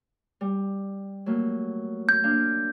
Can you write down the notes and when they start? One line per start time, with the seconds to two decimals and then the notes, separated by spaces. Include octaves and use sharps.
0.41 G3
1.26 F#3 A3 A#3
2.09 G6
2.23 A#3 D4 F5